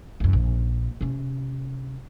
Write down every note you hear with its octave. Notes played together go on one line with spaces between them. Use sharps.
C2 F#2
A#1
C3 C#4